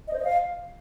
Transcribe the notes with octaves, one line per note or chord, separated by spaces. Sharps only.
D#5
C5
D#5
F5